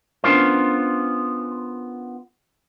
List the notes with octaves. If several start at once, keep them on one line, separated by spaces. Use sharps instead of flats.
B3 C#4 D4 F4 A#4 C5